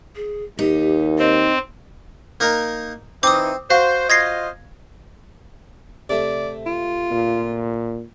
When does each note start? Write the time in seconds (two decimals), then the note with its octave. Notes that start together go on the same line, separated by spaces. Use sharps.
0.16 G#4
0.59 D#2 D#4 G4
1.19 C4 D#5
2.40 A#3 D#4 A#4
3.23 E3 C4 D#4 D6 D#6
3.70 F#4 C5 F5
4.10 F4 C5 D#5 G#6 A#6 C7
6.10 C3 A3 D5
6.66 F4
7.11 A#2